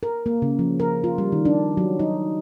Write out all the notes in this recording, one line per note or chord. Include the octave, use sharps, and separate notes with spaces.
A#4
A#3
C#3
F3
A#4
F4
G3
D#3
D4
F#3
D#4